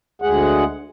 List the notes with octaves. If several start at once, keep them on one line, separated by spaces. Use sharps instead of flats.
D2 G#3 G#4 F#5